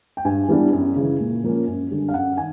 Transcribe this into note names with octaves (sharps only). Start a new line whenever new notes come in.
G5
G2 G#5
E3 G3 B3 D4
F#2
C#3 E3
A#2
F3 A#3 C#4
F#2
D3 G3
F5
F#2 F#5
D#3 G#5